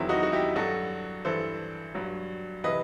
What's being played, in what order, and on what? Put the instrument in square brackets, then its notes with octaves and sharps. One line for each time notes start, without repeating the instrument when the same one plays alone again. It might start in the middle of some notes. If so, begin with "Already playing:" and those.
Already playing: [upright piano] E2 D#3 F#3 C4 E4
D#4 F#4
F#4
E4 G4
G2 F#3 F#4 A4
G2 E3 A4 C5
G2 F#3
C3 E3 B4 D#5